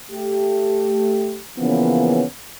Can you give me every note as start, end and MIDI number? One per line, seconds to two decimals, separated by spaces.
0.10 1.39 57
0.10 1.39 67
1.58 2.24 49
1.58 2.24 52
1.58 2.24 53
1.58 2.24 58
1.58 2.24 59
1.58 2.24 61